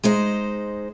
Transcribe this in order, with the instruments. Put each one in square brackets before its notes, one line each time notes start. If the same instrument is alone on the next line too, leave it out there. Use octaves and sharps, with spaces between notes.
[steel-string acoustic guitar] G#3 D#4 C5